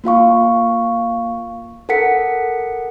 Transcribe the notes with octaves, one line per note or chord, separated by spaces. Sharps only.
A#3 F4 F5 C#6
A4 A#4 F#5 B6 C#7